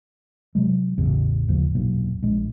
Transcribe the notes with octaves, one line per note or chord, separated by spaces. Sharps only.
C3 F#3 G#3
A1 E2 C#3
G#1 D#2 C#3 F3
E1 B1 F#2 A#2
A#1 G#3